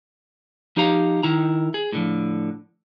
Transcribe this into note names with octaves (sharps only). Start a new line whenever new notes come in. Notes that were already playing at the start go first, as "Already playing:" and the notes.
F3 D#4 G4 F5 A#5
D#3 E4 A#5
G#4
A2 D3 F3